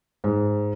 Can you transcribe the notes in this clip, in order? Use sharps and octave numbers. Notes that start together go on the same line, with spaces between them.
G#2